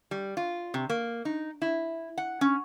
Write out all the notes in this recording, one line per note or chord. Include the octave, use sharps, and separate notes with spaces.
G3
F4
C3
A#3
D#4
E4
F#5
C#4